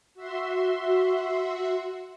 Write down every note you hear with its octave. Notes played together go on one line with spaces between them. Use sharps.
F#4 E5 C6